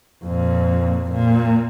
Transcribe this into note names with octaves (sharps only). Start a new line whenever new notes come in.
F2 A#2
A#2